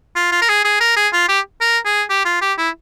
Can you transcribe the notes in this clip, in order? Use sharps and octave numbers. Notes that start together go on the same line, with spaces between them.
F4
F4
A#4
G#4
G#4
A#4
G#4
F4
G4
A#4
G#4
G4
F4
G4
E4